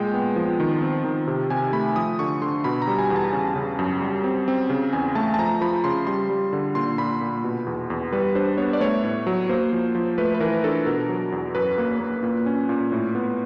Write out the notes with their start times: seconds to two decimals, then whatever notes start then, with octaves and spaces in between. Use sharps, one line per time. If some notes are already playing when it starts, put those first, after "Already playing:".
Already playing: A#2 G#3 G5
0.14 B3
0.36 F3
0.60 D#3
0.82 C4
1.04 D#3
1.28 C3
1.50 C3 G#5
1.73 A3 B5
1.96 F3 D#6
2.19 D3 C#6
2.42 D3 C6
2.64 B2 B5
2.82 A#5
2.87 G3
2.98 G#5
3.10 E2
3.16 A5
3.33 C#3
3.56 C#3
3.79 F#2
4.01 G3
4.24 C4
4.48 C4
4.70 C#3
4.93 E2 G#5
5.15 A3 A5
5.34 A5
5.39 F3 A#5
5.61 F3 B5
5.84 C#3 C6
6.07 G3 C6
6.30 G3
6.53 D3
6.75 A#2 C6
6.98 A#2 B5
7.21 A#2
7.44 B2
7.66 E2
7.90 E2
8.12 G3 B4
8.35 D4 C5
8.58 B3 C#5
8.73 D5
8.80 A3 C#5
9.04 A2
9.27 F#3
9.49 A#3 C5
9.73 F3
9.95 F3
10.18 A3 B4
10.35 B4
10.40 E3 A#4
10.64 D4 A4
10.86 B2 A#4
11.09 F#3
11.32 E2
11.55 F#2 B4
11.78 A#3
12.00 A#3
12.23 A#2
12.46 C#4
12.69 A#2
12.92 A2
13.15 B3